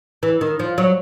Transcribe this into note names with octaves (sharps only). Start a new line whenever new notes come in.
E3
D#3
F3
F#3